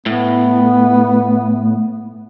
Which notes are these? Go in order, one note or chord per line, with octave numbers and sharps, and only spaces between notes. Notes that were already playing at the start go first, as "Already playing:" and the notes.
A2 B3